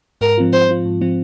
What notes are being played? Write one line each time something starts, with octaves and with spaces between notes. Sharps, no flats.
G#2 A#4
F3 C4 F4
G#2 C5
F3 C4 F4
G#2
F3 C4 F4